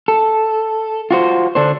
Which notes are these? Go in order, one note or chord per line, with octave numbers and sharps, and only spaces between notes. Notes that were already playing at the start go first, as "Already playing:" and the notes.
A4
F4 F#4 C5
D3 D4 C5